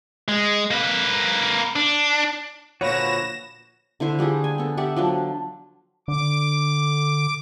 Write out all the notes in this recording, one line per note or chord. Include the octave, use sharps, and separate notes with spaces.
G#3
A#3 B4
D4
A#2 D3 F3 F#4 B4 C#5 A#6 E7
D3 E4 C5 E5
F3 G3 G4 G#4
G#5
B3 A4
G4 D5 E5 F#5
F3 F#3 D4
D3 D6